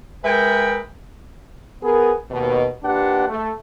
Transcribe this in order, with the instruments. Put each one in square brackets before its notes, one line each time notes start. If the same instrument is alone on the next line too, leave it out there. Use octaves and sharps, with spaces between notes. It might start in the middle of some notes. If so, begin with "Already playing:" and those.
[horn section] G#3 A#4 B4 E5 G5
[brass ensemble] B3 G#4 A#4
D#2 B2
D#2 A#2 D4 G4 B4 F#5
A3